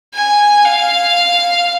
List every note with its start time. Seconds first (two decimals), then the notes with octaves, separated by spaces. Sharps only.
0.14 G#5
0.65 F5